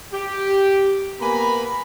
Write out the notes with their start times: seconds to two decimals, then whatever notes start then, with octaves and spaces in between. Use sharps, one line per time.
0.13 G4
1.20 A#3 B3 B4 G#5 A#5 B5